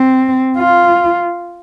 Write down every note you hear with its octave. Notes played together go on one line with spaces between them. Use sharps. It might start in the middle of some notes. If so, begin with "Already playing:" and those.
Already playing: C4
F4